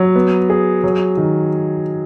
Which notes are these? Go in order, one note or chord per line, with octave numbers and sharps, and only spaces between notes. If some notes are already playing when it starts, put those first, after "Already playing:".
Already playing: F#3
B3
G#4
F#3
D#3